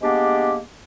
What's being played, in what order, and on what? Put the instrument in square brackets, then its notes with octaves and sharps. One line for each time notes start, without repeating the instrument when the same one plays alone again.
[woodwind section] G#3 A#3 B3 D4 G4